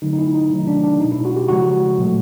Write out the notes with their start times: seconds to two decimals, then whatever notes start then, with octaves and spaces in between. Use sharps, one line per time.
0.02 D3 F#3 A3 D#4
0.13 D#4
0.19 E4
0.34 D#4
0.50 C3 D#3 F#3 A3
0.67 D4
0.83 D4
1.00 B2 G#3 D#4
1.12 E4
1.25 F#4
1.36 G4
1.49 C#3 F3 G#3 F#4
1.98 A#2 F#3 A3